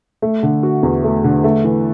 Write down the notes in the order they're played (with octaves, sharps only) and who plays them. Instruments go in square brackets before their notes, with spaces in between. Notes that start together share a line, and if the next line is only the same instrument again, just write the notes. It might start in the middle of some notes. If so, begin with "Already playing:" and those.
[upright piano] A3
D3
F#4
E2
A3
D3
A3
E3